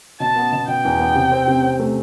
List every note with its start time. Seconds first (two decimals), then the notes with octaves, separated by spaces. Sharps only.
0.20 B2 A5
0.36 B3
0.52 B2
0.67 B2 G5
0.85 E2
1.00 B3
1.15 C3
1.32 C4
1.47 C3
1.63 C4
1.80 A3